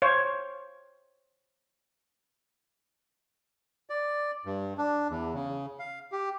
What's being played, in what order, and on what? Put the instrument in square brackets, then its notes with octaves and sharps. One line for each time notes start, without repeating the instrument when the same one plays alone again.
[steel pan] C5 C#5 F5
[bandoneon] D5
G2
D4
E2
C#3
F5
G4